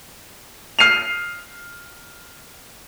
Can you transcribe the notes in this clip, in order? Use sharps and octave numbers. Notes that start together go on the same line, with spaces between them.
F6 C7 D#7 F7